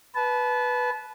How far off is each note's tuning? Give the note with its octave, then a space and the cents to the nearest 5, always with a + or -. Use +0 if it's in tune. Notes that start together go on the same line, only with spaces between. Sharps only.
B4 +0 A5 -30